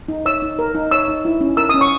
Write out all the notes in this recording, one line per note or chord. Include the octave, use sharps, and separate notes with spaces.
D#4
C#5 E6
D#4
A#4
D#4
C#5 E6
D#4
E4
C#4
A#4 E6
C#4 D#6
C#6